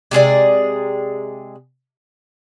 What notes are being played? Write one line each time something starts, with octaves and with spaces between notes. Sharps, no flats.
C3 G#3 G#4 D5